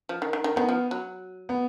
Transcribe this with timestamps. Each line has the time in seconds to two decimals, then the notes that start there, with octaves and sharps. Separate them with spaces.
0.09 F3
0.22 D#3
0.33 D#3
0.44 D#3
0.56 D#3 B3
0.69 F3
0.91 F#3
1.49 B3